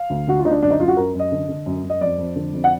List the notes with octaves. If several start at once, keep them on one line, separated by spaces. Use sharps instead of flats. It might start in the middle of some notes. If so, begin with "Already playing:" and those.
Already playing: F5
D2
D3 F#4
F4
D2 D#4
D4
F#2 D4
D#4
F#2 F4
F#4
F#2 A#4
F#2
D#5
D3
D3
F#2
F#2
D#5
F2 D5
F2
D3
F2
F#5